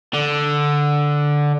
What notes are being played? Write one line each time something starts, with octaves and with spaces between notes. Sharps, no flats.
D3